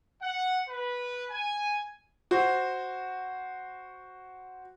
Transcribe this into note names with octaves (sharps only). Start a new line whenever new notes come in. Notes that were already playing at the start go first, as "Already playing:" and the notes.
F#5
B4
G#5
F#4 C5